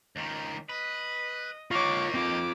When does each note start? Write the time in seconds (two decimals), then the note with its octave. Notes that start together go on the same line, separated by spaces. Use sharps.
0.16 C#2 D#3
0.69 B4 D#5
1.71 D#3 A#3 F4 C#5 C#6 D6
2.14 C4 F4 D6